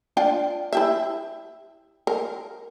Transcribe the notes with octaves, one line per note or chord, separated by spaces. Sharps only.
D4 F4 G5
E4 G4 E5
A#4